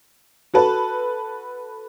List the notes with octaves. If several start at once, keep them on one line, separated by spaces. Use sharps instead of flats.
F#4 A4 B4 A5